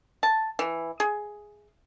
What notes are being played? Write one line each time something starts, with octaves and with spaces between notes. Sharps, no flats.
A5
E3
G#4